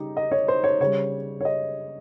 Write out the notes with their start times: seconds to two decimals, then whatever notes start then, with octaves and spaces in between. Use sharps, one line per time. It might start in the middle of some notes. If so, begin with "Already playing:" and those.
Already playing: C#3 G3 D#4 G4
0.17 D#5
0.31 C#5
0.48 C5
0.64 C#5
0.80 C#3 G3 C#5
1.41 C#5
1.45 D#5